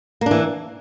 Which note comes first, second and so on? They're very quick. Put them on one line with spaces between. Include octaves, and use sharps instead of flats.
A#3 D4 E3